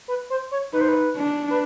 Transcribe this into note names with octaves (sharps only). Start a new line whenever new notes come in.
B4
C5
C#5
D#4 B4
C5
B4
D4
B4